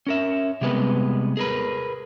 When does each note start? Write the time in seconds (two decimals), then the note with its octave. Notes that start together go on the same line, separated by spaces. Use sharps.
0.07 C#4 A#4 E5
0.61 C3 G3 G#3 B3 B4
1.37 G#4 A#4 B4